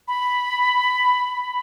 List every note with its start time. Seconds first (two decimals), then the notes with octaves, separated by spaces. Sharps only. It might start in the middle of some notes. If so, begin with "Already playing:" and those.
0.08 B5